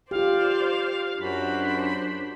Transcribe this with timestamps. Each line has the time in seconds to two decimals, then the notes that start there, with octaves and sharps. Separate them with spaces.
0.11 F4 G4 C5 D5 F5
1.20 F#2 D4 F#4 C5 B5